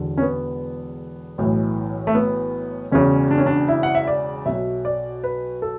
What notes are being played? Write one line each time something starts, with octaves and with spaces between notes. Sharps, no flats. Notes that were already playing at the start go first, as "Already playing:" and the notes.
Already playing: E1 E2 D3
C#4
B3
B1 A2 E3
A3
B3
E1 E2 C#3 C#4
D4
C#4
D4
E4
F#5
E5
D5
B1 B2 F#3 E5
D5
B4
A4